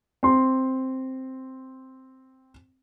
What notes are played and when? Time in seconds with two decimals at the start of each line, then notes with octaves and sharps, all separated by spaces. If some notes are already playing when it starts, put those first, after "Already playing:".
0.23 C4 C6